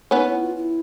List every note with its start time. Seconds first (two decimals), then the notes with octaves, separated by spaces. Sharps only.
0.11 B3 C#4 D#4
0.27 E4
0.42 F4
0.56 E4